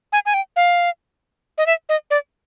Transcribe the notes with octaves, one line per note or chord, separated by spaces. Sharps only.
G#5
G#5
G5
F5
D#5
E5
D#5
D5